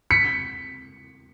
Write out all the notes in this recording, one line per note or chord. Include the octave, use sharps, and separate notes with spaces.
B6 C#7